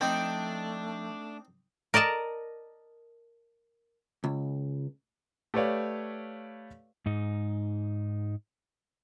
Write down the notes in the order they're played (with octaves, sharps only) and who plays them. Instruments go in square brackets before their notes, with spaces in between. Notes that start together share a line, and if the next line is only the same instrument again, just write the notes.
[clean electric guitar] F3 G5 [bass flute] A3 [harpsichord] C4 D#4 [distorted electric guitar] D4
[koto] A#4 D5 D#5 A5 A#5
[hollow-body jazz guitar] C#2
[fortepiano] A3 G4 B4 C#5 D5 F5
[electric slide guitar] G#2 D#4